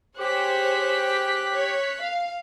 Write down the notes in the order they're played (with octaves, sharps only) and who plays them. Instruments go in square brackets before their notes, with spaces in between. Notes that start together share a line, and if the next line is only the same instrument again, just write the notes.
[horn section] G4 [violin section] G#4 C5 C#5 [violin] F#6 B6
[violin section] C#5
F5